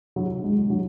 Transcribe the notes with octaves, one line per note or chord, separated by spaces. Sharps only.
F#3
G#3
F#3